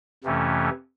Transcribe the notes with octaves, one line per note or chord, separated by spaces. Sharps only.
F2 C3 E3 A3 C#4